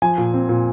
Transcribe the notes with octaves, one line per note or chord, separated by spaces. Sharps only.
F3 G#5
A#2
C4
A#2